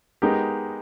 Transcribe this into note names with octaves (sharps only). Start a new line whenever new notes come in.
G#3 B3 D#4 G4 A#4